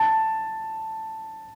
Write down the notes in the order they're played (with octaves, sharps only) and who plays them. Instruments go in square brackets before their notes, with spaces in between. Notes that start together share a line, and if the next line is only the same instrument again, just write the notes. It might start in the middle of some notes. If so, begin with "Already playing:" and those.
Already playing: [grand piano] A5